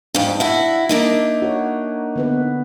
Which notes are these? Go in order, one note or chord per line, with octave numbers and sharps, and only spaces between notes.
F2 G#2 D4
E4 F#4 E5
A#3 D4 D#4
F#4 C#5
D3 B3 B4